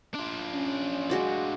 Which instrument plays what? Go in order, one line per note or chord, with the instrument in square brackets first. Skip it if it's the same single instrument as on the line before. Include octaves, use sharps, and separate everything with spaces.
[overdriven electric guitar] D4 F4
[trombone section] C#4
[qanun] G#3 F#4 D5